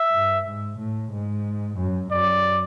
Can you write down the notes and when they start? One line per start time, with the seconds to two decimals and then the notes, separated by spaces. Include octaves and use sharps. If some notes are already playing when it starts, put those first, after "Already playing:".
Already playing: E5
0.12 G2
0.46 G#2
0.79 A2
1.12 G#2
1.78 F#2
2.11 F#2 D5